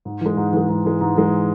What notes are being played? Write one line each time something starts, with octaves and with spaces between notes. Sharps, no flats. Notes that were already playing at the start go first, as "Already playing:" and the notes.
G#2
E3 G#3
G#2
E3 G#3
G#2
E3 G#3
G#2
E3 G#3